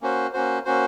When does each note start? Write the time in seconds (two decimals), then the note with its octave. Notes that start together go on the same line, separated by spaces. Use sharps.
0.01 A#3 C#4 F#4 C5
0.33 A#3 C#4 F#4 C5
0.65 A#3 C#4 F#4 C5